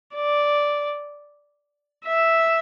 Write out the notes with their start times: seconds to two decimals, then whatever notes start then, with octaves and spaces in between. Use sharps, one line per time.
0.16 D5
2.06 E5